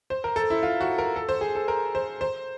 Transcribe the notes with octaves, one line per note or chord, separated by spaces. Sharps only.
C5
A#4
A4
E4
F4
F#4
A#4
A4
C5
G#4
A4
A#4
C5
C5